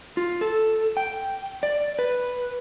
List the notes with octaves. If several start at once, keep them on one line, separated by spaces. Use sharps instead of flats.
F4
A4
G5
D5
B4